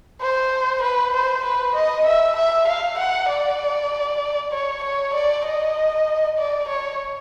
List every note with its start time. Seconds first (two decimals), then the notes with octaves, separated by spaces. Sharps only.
0.21 C5
0.82 B4
1.13 C5
1.44 B4
1.75 D#5
2.06 E5
2.36 E5
2.67 F5
2.98 F#5
3.29 D5
4.52 C#5
4.83 C#5
5.14 D5
5.45 D#5
6.37 D5
6.68 C#5